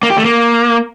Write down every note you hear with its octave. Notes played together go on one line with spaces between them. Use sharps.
A#3
G4
A3
A#3